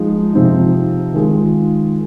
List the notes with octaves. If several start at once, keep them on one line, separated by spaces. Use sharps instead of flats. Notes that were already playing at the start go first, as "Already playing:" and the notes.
Already playing: F3 G#3 D#4
C3 F3 C4 D#4
D#3 G#3 F4